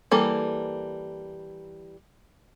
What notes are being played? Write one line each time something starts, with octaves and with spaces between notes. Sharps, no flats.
E3 G3 A#3 A4